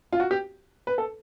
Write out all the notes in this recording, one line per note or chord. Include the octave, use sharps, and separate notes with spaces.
F4
F#4
G4
B4
A4